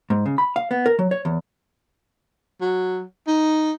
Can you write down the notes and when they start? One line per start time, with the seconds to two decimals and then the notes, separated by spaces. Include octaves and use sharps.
0.10 G#2
0.26 C#3
0.38 B5
0.56 F5
0.71 B3
0.86 A#4
0.99 F#3
1.11 C#5
1.25 E2
2.61 F#3
3.27 D#4